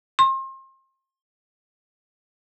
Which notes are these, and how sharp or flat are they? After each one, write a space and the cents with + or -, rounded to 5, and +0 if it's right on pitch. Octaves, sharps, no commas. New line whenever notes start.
C6 +35